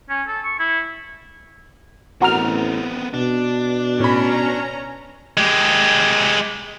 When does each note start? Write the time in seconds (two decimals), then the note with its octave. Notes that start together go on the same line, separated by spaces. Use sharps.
0.10 C#4
0.28 A4
0.45 C#6
0.59 E4
2.22 A1 B3 C4 F#4 A#4 F6
3.14 B2 D4
4.00 A2 C#4 A#5 B5
5.37 G#3 G4